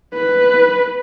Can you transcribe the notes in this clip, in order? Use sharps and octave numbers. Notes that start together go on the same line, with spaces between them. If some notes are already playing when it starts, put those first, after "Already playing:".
B4